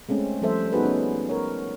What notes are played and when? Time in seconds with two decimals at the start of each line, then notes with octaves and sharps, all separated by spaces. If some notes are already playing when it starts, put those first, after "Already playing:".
0.09 G#3 A3 C4 C#4
0.42 F3 G3 A3 A4 C5 E5
0.73 B3 D#4 F#4 G#4 B4
0.85 C#4
1.29 A#4 C#5